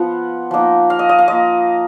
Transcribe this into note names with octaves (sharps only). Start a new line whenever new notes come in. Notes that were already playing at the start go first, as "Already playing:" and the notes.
Already playing: F3 B3 F4 F#5
F3 A#3 D#4
F5
D#5
D#5
F5
A#3 F4 D#5